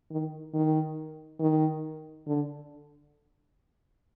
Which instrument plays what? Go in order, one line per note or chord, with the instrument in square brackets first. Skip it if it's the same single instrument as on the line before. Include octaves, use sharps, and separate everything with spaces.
[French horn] D#3
D#3
D#3
D3